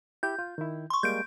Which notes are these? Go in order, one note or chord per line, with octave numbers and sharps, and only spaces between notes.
E4 G4 G6
F4
D#3 E4
C6 C#6
G3 G#3 A#3 G6 D7